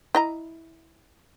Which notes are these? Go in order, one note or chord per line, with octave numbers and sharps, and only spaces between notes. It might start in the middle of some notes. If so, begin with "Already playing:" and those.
E4 D#5 A#5